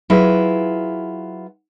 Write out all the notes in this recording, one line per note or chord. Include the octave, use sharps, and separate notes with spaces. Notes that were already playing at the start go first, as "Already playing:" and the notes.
F#3 E4 F4 G#4 B4